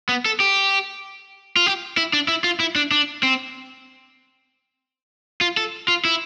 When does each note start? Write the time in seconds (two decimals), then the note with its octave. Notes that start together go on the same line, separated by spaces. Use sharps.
0.09 B3
0.26 A4
0.40 G4
1.56 F4
1.66 G4
1.97 E4
2.13 D4
2.28 E4
2.44 F4
2.60 E4
2.76 D4
2.91 D4
3.23 C4
5.41 F4
5.57 A4
5.88 F4
6.05 E4